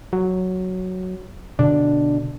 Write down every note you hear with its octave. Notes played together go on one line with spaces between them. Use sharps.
F#3
B2 D3 D4